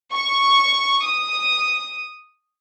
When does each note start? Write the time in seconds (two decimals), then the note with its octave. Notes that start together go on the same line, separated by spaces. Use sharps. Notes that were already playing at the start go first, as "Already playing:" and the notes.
0.12 C#6
1.04 D#6